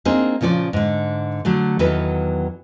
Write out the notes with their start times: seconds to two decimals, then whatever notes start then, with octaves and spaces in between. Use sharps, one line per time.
0.05 A#3 C4 D4 D#4 G#4
0.41 A#2 C#3 F3 C#5 D5
0.73 G#2 D3
1.45 D3 F#3 A3
1.79 E2 D#3 E3 F#3 A4 B4